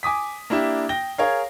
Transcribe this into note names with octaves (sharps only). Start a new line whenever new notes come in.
G#5 D6 D#6 B6
A#3 D4 E4 G4
G5 A#6 G7
G#4 A#4 C#5 F5